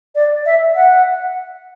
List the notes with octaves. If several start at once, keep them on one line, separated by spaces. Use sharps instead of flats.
D5
E5
F#5